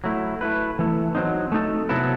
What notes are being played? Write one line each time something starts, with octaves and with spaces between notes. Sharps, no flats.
F#3 A3 E4
A3 E4 B4
E3 A3 E4
F#3 C4 D#4
A3 D#4 A4
C3 F#3 B3 E4 A4